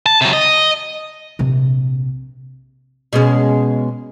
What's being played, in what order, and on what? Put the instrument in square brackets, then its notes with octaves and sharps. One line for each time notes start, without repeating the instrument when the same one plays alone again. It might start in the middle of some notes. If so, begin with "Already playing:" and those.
[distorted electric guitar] A5
C3 F#3
D#5
[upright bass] A#1 C3
[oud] B2 G#3 C#4